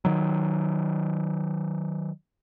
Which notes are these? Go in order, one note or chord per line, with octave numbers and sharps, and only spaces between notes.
D#3 F#3